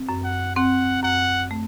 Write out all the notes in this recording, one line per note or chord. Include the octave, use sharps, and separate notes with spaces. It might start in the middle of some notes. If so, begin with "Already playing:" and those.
Already playing: C4
F#2
F#5
C4 F#5
F#2 F#5
A3